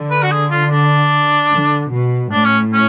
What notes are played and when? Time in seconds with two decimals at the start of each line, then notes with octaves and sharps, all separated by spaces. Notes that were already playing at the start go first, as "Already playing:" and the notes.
Already playing: D3
0.11 B4
0.23 F#4
0.31 G#4
0.51 F4
0.71 D4
1.52 D3
1.91 B2
2.31 A2 D4
2.45 C#4
2.73 C#4